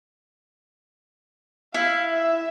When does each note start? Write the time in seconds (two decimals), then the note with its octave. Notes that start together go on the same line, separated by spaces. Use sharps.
1.74 E4 F5
2.13 E5